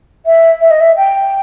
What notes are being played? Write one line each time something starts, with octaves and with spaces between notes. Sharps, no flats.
E5
E5
D#5
E5
G5